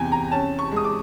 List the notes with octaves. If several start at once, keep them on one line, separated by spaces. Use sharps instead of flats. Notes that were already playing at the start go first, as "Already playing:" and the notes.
Already playing: E2 C3 G5 G#5
A#5
C#4 A5
C#6
G#3 D#6
D6